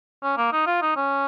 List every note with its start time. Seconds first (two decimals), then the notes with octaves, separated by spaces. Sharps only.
0.23 C#4
0.37 A#3
0.52 D#4
0.66 F4
0.82 D#4
0.96 C#4